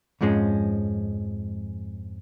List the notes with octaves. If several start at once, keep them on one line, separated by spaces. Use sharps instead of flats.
F2 G#2 F3 G#3 C#4